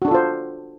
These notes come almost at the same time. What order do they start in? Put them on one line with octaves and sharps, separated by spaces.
F#4 D4 A4 F4 C5